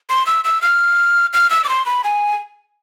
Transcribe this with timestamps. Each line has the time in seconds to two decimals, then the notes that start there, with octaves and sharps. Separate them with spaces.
0.10 C6
0.26 E6
0.45 E6
0.62 F6
1.33 F6
1.50 E6
1.64 D6
1.69 C6
1.86 B5
2.04 G#5